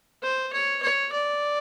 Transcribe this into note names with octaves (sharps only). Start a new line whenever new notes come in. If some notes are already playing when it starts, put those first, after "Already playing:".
C5
C#5
C#5
D5